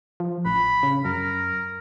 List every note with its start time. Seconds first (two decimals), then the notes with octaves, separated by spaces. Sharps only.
0.20 F3
0.45 A1 B5
0.83 C#3
1.05 F#2 A#4